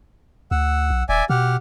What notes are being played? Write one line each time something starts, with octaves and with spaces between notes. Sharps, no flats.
D2 F#5 E6
B1
D#1 D5 E5 G#5
B2 G4 F#5 F6